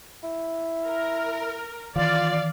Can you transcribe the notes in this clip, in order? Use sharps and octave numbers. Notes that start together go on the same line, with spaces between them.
E4
A#4
D#3 E3 F4 D5 F5